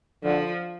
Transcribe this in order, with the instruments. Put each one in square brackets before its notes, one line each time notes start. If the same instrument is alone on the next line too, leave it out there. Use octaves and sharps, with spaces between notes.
[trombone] D3 [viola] F3